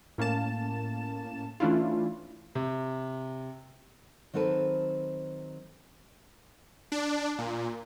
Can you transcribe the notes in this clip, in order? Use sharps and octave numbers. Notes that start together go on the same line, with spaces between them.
A2 A#3 C#4 A5 E7
E3 A3 C#4 D4 E4 F4
C3
D#3 F#3 C4 A4 B4
D4
A#2